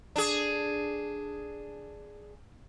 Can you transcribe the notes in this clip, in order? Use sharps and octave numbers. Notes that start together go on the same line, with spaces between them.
D4 G#4